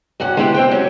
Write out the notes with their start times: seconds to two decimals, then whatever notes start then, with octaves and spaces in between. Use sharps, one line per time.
0.20 E2 G2 C#4 F#4 F#5
0.37 G#3 B3 D4 E4 F#4 G4
0.55 C4 C5 G5
0.71 F#3 C#4 C#5